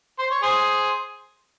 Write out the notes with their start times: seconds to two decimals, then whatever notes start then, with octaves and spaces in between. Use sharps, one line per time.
0.19 C5
0.31 C#5
0.43 G#4 C5